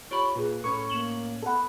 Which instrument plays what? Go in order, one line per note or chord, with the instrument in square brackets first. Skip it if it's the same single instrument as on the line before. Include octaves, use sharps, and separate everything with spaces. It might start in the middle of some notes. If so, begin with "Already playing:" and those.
[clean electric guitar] F4 B5 [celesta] G4 C#5 D7 [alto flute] C#6
[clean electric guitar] A#2 [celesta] F4 G#4 [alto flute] B4
[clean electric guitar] A2 C#4 [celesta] A4 B5 [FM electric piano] C#6
[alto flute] A#3 [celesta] E7 F#7 G7
[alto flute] B3 [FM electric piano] A4 F#5 [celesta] A5 B5